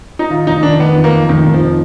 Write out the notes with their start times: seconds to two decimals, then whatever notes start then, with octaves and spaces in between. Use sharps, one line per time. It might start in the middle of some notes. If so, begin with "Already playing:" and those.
0.19 D#4
0.30 D#3 F4
0.47 F1 D#4
0.63 D#3 D4
0.79 D#3 B3
0.96 F2
1.04 A#3
1.13 F2
1.29 F1 D#3
1.45 F1
1.54 F3